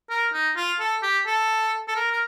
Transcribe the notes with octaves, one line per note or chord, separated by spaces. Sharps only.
A#4
D#4
F4
A4
G4
A4
A4
A#4
A#4